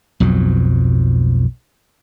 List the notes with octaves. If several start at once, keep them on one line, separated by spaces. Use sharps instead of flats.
B1 F2 G#2 F#3